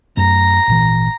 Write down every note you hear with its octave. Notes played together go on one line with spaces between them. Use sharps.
F#2 A3 A#5
G#1 A#2 E3